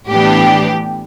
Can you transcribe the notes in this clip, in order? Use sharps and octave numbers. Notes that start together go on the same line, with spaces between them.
A2 E3 B3 D4 G4